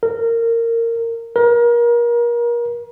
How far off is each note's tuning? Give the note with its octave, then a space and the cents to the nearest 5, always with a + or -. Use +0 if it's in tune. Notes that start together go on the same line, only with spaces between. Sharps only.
A#4 -20
A#4 +30